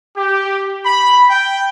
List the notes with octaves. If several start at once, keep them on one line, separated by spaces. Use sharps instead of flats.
G4
B5
G5